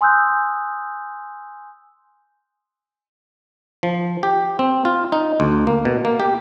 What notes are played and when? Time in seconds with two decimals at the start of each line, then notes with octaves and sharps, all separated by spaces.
0.01 G#5 C6 D#6 E6 F#6 G6
3.83 F3
4.23 G4
4.59 C4
4.85 F4
5.12 D#4
5.40 D2
5.67 A#3
5.85 B2
6.05 A#3
6.20 G4